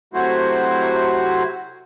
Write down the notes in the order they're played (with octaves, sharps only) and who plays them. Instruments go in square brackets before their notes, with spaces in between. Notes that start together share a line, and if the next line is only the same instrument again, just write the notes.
[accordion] C3 F#3 A3 E4 F#4 C5